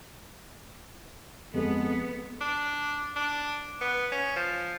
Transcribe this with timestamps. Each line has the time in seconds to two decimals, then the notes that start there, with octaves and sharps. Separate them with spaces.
1.54 F2 G#3 B3 A4
2.41 D4
3.16 D4
3.81 B3
4.12 C#4
4.36 F3